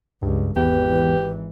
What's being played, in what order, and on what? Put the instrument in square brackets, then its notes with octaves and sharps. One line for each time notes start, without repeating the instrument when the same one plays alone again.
[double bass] C#2 [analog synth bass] G2
[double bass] G#1 E3 [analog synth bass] E2 [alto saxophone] G4 [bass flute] B4